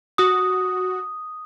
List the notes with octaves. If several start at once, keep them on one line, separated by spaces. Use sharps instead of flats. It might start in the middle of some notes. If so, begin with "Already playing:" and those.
F#4 D#6